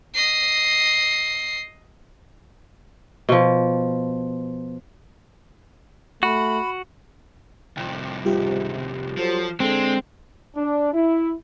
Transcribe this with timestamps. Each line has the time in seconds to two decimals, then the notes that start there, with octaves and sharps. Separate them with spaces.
0.14 D#5 C7
3.29 B2 F3
6.23 A3 F#4 B5
7.77 C2 F2 G5
8.25 C#2 G#2 C3 G3 F4 G4
9.17 F3 F#3 A4 C5
9.60 D3 G#3 C4 D4 A4
10.56 D4
10.93 E4